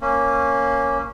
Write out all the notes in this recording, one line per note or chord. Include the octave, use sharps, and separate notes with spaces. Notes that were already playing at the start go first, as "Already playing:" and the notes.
A#3 C#4